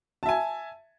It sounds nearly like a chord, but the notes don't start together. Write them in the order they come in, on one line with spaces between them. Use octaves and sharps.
A5 E5 G#5